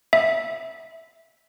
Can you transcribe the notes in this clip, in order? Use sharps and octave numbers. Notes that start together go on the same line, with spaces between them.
E5